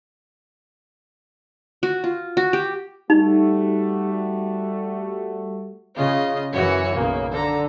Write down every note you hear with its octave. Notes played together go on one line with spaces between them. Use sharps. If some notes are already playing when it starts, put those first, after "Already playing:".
F#4
F4
F#4
G4
G3 A3 D#4 F#4
C#3 F4 D#5
F#2 E3 F#4 C#5
B1 C#3 A#3
D3 A4 A#5